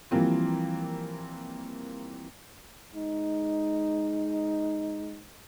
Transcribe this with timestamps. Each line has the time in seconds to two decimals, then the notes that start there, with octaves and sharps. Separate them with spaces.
0.11 E3 F3 G3 A#3 C4 F4
2.95 G#3 D#4